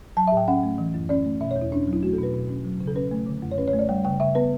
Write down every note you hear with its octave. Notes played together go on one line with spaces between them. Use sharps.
F#3 A5
E5
A2 G5
C#4 F#5
A3
E3
F#2
C#4 D5
A3
B2 E5
C#5
E2
E4
C#4 D4
C#4
F#3
E4
A3 F#4
A4
B2
B4
B2
C#4
F#3
C#3
A4
C#4 B4
A3
D3
F#2
C#5
C#4 B4
C#5
A3
D5
G3 G5
C#3 G5
C#3 E5
B3 B4